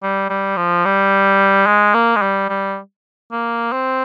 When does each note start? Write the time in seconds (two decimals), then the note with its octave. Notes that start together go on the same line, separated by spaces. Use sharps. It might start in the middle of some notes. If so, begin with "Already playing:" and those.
0.03 G3
0.30 G3
0.57 F3
0.85 G3
1.66 G#3
1.94 A#3
2.16 G#3
2.22 G3
2.50 G3
3.32 A#3
3.73 C4